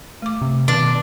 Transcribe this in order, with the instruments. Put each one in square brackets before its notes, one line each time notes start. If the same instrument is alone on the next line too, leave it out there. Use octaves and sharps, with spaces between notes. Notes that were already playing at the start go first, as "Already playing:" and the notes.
[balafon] A3 D6
[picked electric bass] C3
[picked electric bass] B2 [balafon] D#3 [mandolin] D4